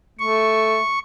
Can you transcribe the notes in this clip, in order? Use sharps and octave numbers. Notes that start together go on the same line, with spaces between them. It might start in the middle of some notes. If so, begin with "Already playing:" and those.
A3 C#6